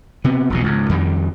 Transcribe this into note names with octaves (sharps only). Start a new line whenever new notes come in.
C3 B3
E1 A#1 B2
C#2 G#2
F2 D#3 G3